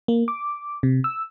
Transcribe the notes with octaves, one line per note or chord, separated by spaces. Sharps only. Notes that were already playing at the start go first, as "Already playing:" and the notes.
A#3
D6
C3
E6